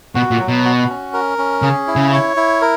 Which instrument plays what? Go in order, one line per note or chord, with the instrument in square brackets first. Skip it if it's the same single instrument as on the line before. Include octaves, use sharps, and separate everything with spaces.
[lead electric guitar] B2 [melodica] F#4
[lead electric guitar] A#2
[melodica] F#3
[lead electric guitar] B2
[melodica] F#4
C#4
A#4
C#4
[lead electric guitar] C#3 [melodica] G#4
[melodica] E4
[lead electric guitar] C#3
[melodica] C#5
E4
A#4